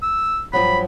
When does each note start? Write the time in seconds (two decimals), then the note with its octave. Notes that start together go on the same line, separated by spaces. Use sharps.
0.03 E6
0.53 G2 F3 F#3 B5